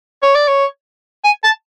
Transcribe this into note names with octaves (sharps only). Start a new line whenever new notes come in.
C#5
D5
C#5
G#5
A5